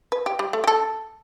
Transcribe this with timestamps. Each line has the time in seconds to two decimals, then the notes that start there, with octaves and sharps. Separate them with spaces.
0.12 B4
0.26 G4
0.39 G3
0.53 A3
0.64 G4
0.67 A4